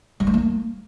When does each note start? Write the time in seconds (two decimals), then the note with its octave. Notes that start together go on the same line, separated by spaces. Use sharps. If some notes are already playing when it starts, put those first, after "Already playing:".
0.20 G3
0.27 D4
0.34 A#3